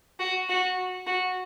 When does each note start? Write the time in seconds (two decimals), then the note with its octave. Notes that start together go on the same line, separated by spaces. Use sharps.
0.20 F#4
0.49 F#4
1.07 F#4